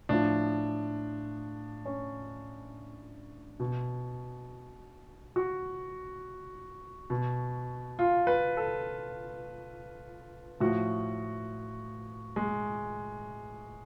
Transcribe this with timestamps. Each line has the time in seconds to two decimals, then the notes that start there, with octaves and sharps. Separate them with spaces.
0.09 A2 F3 D4
1.86 C#4
3.60 B2
5.36 F#4
7.10 B2
7.99 F4
8.27 B4
8.57 A4
10.60 A2 F3 F#4
12.36 G#3